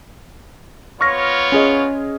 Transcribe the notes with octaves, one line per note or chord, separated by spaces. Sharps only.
B3 F4 C#5 C#6 F6 A#6
C#4 G#4 D#5